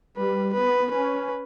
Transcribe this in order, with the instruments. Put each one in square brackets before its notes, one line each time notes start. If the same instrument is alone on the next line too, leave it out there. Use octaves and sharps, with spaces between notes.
[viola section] G3 [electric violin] B4
[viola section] B3 [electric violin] B4
[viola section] C#4 [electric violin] B4